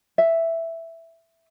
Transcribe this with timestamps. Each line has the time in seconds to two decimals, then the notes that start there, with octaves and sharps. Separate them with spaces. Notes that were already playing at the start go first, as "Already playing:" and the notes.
0.18 E5